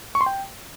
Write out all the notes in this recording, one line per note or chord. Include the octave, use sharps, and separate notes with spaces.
C#6
C6
G5